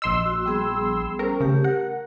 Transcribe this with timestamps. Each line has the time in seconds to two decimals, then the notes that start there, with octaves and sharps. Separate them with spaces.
0.02 A#1 D#5 C6 E6
0.25 F#4
0.46 G3 B3 G#4
1.19 G3 C#4 A#4 C5
1.40 C#3 A3 G4
1.64 A#4 F#5